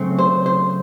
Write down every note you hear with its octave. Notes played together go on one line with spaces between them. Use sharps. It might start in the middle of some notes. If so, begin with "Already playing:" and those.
Already playing: C#3 F#3 A3 C4
C5
C5